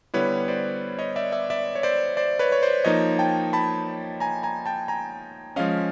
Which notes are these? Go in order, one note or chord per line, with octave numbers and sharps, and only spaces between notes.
D3 G3 B3 E4 B4 C#5
C5 D5
C#5 D#5
D5 E5
D5 E5
D5 E5
C#5
C5 D5
C5 D5
B4 C#5
C#5
C5 D5
F3 A#3 D#4 C#5 D#5
G5 A5
A5 B5
G#5 A#5
G#5 A#5
G5 A5
G#5 A#5
F3 G#3 C#4 D#5 F5